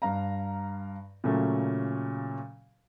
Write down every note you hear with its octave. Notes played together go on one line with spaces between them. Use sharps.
G2 F5 A#5
A#2 C#3 F#3 A3 C#4